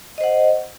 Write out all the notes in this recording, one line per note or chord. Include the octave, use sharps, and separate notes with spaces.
C5 D#5 F#5